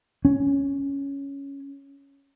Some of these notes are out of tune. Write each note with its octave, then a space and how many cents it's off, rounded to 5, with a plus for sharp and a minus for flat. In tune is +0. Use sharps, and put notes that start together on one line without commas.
C#4 +5